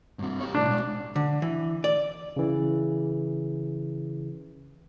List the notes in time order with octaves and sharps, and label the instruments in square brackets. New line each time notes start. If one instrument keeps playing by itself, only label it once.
[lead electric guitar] G2 C4
G4 C#5
[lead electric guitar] C2 A2 [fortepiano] D4
[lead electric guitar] B2 G#3
[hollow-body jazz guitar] D3
E3
D5
[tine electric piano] C#3 E3